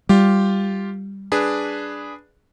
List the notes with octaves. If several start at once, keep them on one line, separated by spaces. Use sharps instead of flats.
G3 F4 G4
D4 G#4 B4